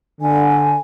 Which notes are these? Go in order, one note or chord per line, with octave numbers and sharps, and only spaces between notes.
D3 G#5